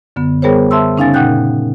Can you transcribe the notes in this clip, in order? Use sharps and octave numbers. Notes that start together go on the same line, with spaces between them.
F#2 D3 B3
G3 B3 G#4 A#4 C5 C#5
E5 A5 C6 E6
C#3 C#4 D#4 F5 G#5 A6
A#2 D#4 F#5 G5 F#6 G6